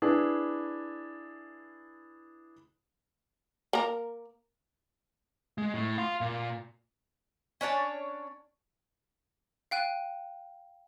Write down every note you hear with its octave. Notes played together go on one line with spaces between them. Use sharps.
D4 E4 G#4 B4
A#3 A#4
G#3
A2
F5 C6
A#2
C#4 D4 C#5 A5
F5 G5 F#6 D#7